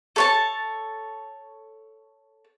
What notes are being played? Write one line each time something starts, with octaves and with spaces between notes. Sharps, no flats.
A4 C#5 A5